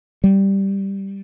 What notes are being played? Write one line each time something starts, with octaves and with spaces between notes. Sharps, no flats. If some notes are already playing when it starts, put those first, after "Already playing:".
G3